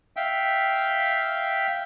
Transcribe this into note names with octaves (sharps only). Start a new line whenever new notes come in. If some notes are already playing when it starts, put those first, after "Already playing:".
E5 F5 G5